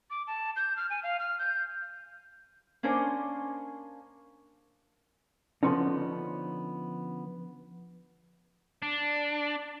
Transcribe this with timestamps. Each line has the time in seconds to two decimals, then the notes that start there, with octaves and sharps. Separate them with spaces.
0.10 D6
0.27 A5
0.56 G6
0.77 F6
0.90 G#5
1.03 F5
1.19 F6
1.39 G6
2.83 A#3 C#4 D4 A#4 C5
5.63 D3 F3 B3 C#4 D#4
8.82 D4